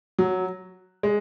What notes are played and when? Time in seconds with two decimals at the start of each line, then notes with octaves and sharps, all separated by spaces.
0.19 F#3
1.03 G#3